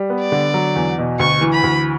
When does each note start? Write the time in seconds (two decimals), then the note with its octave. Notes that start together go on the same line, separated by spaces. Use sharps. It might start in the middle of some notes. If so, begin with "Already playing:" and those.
Already playing: G3
0.10 B3
0.21 D5
0.32 D3
0.54 F#3
0.76 E2
0.98 B2
1.19 D2 C#6
1.41 E3
1.53 B5
1.63 D2